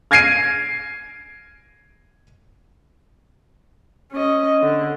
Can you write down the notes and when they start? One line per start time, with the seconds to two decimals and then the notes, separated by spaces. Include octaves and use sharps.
0.11 F6 G#6 A#6 C7 D7 D#7
4.12 C#4 D#5
4.62 D3